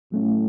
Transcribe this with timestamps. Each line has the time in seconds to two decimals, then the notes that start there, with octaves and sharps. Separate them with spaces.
0.12 A2 F#3 A3 C#4